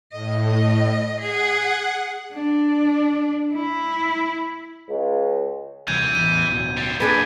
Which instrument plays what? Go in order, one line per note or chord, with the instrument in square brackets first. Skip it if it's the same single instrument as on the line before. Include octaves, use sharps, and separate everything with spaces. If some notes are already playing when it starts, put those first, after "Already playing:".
[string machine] A2 [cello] D#5
[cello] G#4 [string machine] F#5
[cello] D4
E4
[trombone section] C#2
[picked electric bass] D#1 C2 [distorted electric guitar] E3 [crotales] G6 G#6 D#7
[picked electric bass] A1 E2 [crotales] D#7
[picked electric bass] D1 B1 B2
[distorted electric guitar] G3 C4
[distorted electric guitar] F2 [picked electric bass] A#2 [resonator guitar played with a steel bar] D4 G#4 B4